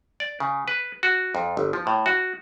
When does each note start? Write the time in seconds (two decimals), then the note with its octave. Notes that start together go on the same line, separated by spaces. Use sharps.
0.20 D5
0.40 C#3
0.68 B4
1.03 F#4
1.35 F2
1.57 G1
1.73 F3
1.87 A2
2.06 F#4